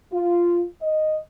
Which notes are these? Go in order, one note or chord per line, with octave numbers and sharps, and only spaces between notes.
F4
D#5